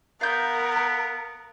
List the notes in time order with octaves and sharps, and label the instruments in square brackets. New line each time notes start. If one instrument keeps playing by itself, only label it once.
[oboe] B3 [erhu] A#4 [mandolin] F5 G6